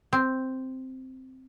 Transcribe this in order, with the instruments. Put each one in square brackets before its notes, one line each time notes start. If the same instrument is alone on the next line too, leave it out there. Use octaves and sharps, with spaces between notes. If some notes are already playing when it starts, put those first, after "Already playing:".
[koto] C4